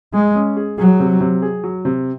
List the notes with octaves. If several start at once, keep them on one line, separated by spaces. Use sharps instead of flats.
G#3 G#4
C#4
G#4
F#3 G#4
C3
C3
G#4
F#3
C3